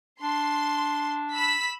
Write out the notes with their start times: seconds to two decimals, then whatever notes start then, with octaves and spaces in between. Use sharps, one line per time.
0.22 D4 C6
1.34 B5 E6 B6